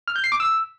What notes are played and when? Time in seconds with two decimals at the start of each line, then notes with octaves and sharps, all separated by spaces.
0.08 F6
0.16 G6
0.24 C7
0.32 D6
0.40 E6